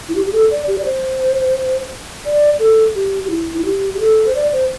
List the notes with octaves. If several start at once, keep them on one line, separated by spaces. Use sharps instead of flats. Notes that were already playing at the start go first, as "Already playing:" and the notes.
E4
G4
G4
A4
D5
G4
D5
C5
D5
A4
G4
G4
E4
E4
G4
G4
A4
C5
D5
C5